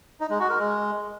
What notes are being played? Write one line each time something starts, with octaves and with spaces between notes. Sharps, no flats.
D#4
G#3
F#4
A#4
G#3